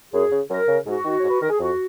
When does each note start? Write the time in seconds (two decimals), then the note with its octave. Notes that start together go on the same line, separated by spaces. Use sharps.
0.13 F#2 G#4
0.32 C#3
0.50 F#2 A#4
0.68 C#3
0.87 G#2 F#4
1.05 D#3
1.20 G#2 C#5
1.30 B4
1.40 D#3 A#4
1.50 G#4
1.60 F2 F#4